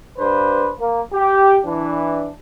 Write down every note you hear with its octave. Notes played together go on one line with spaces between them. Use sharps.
G2 D4 B4 C5
A#3
G4
E3 D4